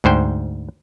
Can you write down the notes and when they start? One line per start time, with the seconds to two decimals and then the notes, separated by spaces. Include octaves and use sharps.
0.04 D2 G#2 C5 G5